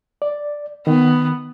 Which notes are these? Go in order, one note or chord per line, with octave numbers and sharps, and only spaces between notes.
D5
D#3 B3